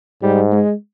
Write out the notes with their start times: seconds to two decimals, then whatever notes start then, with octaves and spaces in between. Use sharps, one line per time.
0.23 G#2 G3
0.52 G#3